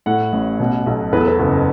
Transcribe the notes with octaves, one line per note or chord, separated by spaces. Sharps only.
A2 F#5
A1
B2
B1
E2 B4
A4
B4
F#1